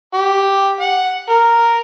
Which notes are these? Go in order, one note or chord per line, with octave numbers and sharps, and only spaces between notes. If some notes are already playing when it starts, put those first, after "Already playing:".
G4
F#5
A#4